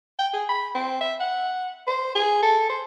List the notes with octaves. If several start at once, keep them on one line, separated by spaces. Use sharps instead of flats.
G5
G#4
B5
C4
E5
F#5
C5
G#4
A4
C5